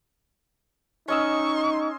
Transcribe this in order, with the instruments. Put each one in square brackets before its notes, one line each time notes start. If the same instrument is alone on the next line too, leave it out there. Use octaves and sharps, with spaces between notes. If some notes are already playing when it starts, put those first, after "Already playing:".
[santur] C#4 D#5 E6 [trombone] D#4 [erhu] C#6